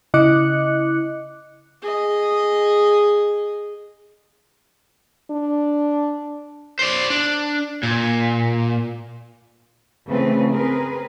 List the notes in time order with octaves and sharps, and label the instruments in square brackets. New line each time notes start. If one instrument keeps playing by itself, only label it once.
[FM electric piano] C#3 E4 D#5 D6 F#6 C#7
[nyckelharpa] G#4 D#5
[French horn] D4
[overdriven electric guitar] C5 D5
D4
A#2
[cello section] C#3 E3 A3 C4 B4
C4 G#4 A#4 B4